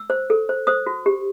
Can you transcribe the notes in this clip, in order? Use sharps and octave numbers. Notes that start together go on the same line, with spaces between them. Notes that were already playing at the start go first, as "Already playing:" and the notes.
Already playing: E6
C5
A4
C5
C5 D#6
F#4
G4